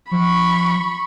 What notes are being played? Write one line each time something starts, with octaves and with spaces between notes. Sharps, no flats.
F3 B5 C#6